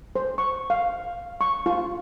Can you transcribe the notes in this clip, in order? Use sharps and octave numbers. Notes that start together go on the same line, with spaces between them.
C5
C#6
F5
C#6
F4